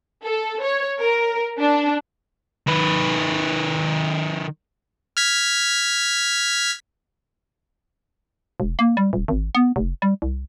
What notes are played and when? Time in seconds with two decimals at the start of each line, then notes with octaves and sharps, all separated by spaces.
0.24 A4
0.62 C#5
0.99 A#4
1.60 D4
2.67 D#3 B4
5.17 F6 G#6 B6
8.60 E1
8.79 A#3
8.97 G3
9.13 D#1
9.28 G#1
9.55 B3
9.76 F1
10.02 G3
10.22 C2